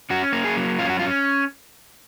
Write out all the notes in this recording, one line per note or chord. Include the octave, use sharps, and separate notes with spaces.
C#4 F#4
A#3
G#4
F#3
C#4 F4
F#4
C#4 F4